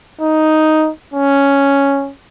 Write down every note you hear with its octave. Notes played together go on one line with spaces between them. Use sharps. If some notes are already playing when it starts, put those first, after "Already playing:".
D#4
C#4